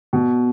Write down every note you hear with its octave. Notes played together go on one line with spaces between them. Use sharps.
B2